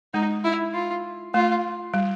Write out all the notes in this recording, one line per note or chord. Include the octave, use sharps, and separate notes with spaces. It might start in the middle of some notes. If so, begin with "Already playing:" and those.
G#3 D#4
E4
F4
A3 F4
G3